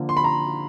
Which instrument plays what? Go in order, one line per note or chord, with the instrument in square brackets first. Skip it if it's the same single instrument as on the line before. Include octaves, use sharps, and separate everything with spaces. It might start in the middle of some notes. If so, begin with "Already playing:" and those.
Already playing: [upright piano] D3 F3 A#3
C6
B5
A#5